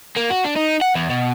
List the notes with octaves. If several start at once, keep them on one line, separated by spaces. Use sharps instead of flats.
A#3
F#4
D4
D#4
F#5
E2
B2